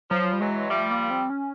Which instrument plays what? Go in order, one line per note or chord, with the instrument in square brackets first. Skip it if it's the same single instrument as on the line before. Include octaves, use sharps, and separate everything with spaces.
[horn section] F3 [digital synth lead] F#3
[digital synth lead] G3
[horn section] E3 F#3 [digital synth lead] G#3
[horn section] F3 G3 [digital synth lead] A3
[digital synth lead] A#3
C4
C#4